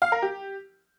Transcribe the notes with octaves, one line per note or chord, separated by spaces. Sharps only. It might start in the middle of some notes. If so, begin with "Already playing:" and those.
F5
A#4
G4